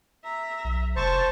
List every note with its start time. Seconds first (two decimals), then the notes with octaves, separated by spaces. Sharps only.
0.24 E5 A#5
0.64 B1
0.96 F1 C5 A5 C#6